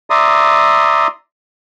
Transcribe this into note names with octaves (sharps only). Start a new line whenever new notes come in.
D5 E5 A#5 C6 D#6